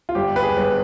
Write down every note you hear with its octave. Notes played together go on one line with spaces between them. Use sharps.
F4
G1 G4
B4
G#4
G1